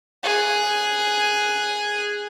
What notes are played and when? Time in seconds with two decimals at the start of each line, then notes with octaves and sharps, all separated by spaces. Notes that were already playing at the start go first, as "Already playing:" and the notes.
0.23 G#4 F#6